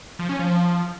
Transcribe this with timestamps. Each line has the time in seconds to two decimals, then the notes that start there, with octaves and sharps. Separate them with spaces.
0.19 F3
0.29 C#4
0.39 F3